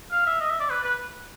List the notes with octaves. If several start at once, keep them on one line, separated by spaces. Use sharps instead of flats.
F5
E5
D#5
E5
D5
B4
B4